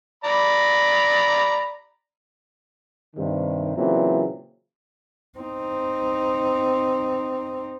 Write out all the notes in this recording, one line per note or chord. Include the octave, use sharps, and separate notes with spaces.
D5 A#5 B5
G2 C3 D#3
A#2 C#3 E3 F#3 C4
C4 D#4